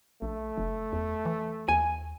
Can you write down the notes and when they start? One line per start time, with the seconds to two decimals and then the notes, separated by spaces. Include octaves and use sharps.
0.22 A#1 A3
0.58 F1
0.93 E2
1.26 E3
1.68 D#2 G#5